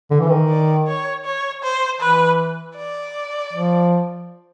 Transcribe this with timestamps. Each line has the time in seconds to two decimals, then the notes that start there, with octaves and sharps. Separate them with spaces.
0.11 D3
0.20 E3
0.29 D#3
0.49 D5
0.87 C#5
1.25 C#5
1.63 C5
2.01 E3 B4
2.76 D5
3.53 F3